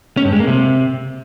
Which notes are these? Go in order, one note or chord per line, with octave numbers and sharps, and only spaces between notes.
C#4
G2
G#3
A#3
C3